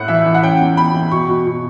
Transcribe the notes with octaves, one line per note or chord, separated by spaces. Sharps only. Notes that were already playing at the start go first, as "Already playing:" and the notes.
Already playing: A2 A3 F#5
E3 E5
E3
F#5
C#4 G5
E2
E2 B5
E2
B2 C#6
B2
B2